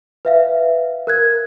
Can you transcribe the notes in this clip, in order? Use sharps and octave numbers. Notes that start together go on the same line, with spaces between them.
B4 E5 F5
A#4 F#6 G#6